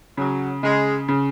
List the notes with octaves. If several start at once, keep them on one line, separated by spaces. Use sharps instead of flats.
C#3 F#3
C#3 G#3
C#3